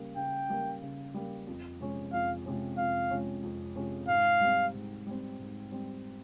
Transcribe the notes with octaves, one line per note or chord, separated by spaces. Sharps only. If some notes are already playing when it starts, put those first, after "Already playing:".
Already playing: C#3 G3 A#3
C#3 G5
G3 A#3
C#3
G3 A#3
F2
C3 F3 G#3 C#4
F2 F5
C3 F3 G#3 C#4
F2 F5
C3 F3 G#3 C#4
F2
C3 F3 G#3 C#4
G#2 F5
G3 C4
G#2
G3 C4
G#2
G3 C4